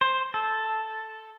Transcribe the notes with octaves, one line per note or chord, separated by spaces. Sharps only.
C5
A4